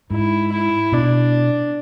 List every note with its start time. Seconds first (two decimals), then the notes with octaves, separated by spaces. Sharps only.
0.11 G#2 E4
0.52 E4
0.92 B2 D4